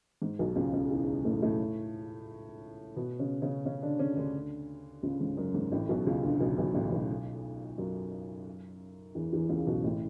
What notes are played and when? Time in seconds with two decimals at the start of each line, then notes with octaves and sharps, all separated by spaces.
0.22 G#2
0.39 B1 B2
0.56 C#2 C#3
0.73 C#2 C#3
0.90 E2 E3
1.25 A2 A3
1.42 A2 A3
2.96 B2 B3
3.19 C#3 C#4
3.42 C#3 C#4
3.66 C#3 C#4
3.82 D3 D4
3.99 C#3 C#4
4.17 D2 D3
5.03 C#2 C#3
5.21 G#2
5.37 F#2
5.54 G#2
5.72 A1 A2
5.89 B1 B2
6.06 C#2 C#3
6.23 D2 D3
6.40 B1 B2
6.58 B1 B2
6.74 A1 A2
6.92 B1 B2
7.78 F#2 F#3
9.15 E2 E3
9.33 E2 E3
9.49 C#2 C#3
9.67 B1 B2
9.84 A1 A2